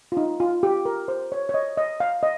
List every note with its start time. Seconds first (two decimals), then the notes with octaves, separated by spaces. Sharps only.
0.12 F4
0.17 D#4
0.40 F4
0.63 G4
0.85 A#4
1.08 C5
1.32 C#5
1.49 C#5
1.54 D#5
1.77 D#5
2.00 F5
2.23 D#5